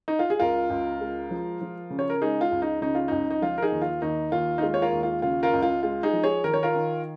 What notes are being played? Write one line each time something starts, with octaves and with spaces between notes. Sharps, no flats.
D#4
F4
G#4
C#2 F4 A#4
C#2
G#3
F3
F3
C#3
C#5
A#4
G#3 D#4 G#4
F4
C#2
D#4
C#3 D#4
F4
C#2 D#4
D#4
F3 F4
A#4
D#4 G#4
D#2
F4
D#2 D#4
D#2 F4
D#4
G#3 F4
C#5
F4 A#4
D#2
F4
C#3 F4
F4 A#4
C#2
F4
G#3 F4
D#4 G#4
F3
G#4 C#5
D#3 A#4
C#5
F4 A#4
D#3